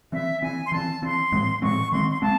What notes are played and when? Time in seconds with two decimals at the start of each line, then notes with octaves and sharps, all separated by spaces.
0.12 E3 C4 E5
0.42 E3 C4 G#5
0.66 C6
0.72 E3 C4 A5
1.02 E3 C4 C6
1.32 A2 E3 G#3 C4
1.62 A2 E3 G#3 C4 C#6
1.92 D#3 G#3 C4 C6
2.11 C6
2.22 G#3 C4 A5